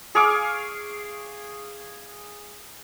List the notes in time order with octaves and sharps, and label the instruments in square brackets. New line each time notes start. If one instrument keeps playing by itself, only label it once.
[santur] G#4 F5 C#6 D6